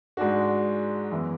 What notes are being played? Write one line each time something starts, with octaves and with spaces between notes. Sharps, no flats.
G#2 G#3 D4 F#4
F#2 E3 B3 E4